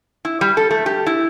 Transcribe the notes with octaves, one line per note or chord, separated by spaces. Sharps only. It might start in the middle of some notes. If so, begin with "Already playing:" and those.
E4
G3
A4
A3
G4
E4